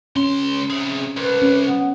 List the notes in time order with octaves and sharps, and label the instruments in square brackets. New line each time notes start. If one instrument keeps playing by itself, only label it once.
[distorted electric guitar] C#2 C6 [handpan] C#4
[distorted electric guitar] C3 G#4
[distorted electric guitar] C2 [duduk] B4
[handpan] C#4
[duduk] B3